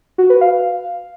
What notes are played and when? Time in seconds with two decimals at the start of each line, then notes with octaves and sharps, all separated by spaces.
0.18 F#4
0.30 B4
0.41 F5